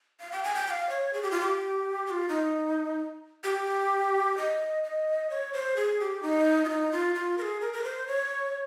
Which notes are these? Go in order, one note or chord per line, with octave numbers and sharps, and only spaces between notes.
F5
G5
G#5
G5
G5
F5
C#5
G#4
G4
F4
G4
G4
F4
D#4
G4
D#5
D#5
C#5
C5
G#4
G4
D#4
F4
D#4
F4
F4
A#4
G#4
A#4
A#4
C5
C#5